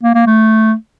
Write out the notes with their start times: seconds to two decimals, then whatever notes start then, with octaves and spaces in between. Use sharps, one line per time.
0.03 A#3
0.15 A#3
0.26 A3